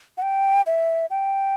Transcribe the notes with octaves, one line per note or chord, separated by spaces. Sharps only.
F#5
G5
E5
G5